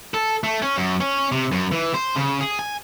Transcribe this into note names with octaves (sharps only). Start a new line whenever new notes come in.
A4
A3
C#4
F#2
C#4
C3
F#2
E3
C5
C#3
G#4
G#5